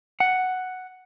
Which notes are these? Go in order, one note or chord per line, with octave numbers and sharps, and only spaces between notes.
F#5